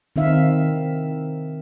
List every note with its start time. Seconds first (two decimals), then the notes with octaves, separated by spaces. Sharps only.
0.16 D#3 C4 D#4 E5 F5